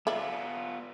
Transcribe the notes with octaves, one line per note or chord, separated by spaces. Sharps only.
B3 F4 D5 E5